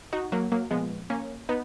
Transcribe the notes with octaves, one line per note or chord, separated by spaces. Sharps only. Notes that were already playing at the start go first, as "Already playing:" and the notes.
D#4 F#4
F#3 A#3
F#3 A#3
A#2 F3 G#3 B3
A#3 C#4
B3 D#4